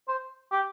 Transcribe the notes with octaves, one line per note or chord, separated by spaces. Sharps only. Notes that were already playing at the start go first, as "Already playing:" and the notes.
C5
G4